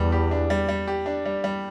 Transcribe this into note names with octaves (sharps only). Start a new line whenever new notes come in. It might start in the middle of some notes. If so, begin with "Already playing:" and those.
Already playing: E2 G3
G4
D4
G3
G3
G4
D4
G3
G3